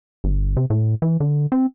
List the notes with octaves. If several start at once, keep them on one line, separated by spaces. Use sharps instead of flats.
G1
C3
A2
E3
D3
C4